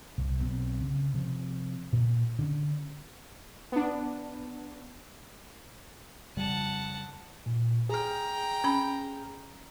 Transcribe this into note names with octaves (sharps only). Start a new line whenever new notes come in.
C2
B1 B3 C4
C#3
C3 F3
A#2
D3 C#4 D4
B3 D4
F2 C#3 G3 F#5 A5
A#2
G#4 G5 A#5 F6
C#4 B5